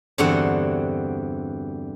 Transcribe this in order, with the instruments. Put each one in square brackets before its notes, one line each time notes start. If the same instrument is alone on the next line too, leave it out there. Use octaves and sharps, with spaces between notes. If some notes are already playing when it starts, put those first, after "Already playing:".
[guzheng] E2 G2 D3 C4 F#4 F#5